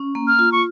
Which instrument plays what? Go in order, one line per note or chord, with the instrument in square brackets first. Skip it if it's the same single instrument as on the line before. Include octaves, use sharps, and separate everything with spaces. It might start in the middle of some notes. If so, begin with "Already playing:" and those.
Already playing: [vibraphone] C#4
A#3
[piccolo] F6
[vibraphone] F4
[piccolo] C#6